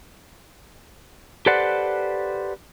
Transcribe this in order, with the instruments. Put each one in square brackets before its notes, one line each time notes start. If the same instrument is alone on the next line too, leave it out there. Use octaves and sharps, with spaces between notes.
[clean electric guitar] G4 A4 B4 C5 D5 F#5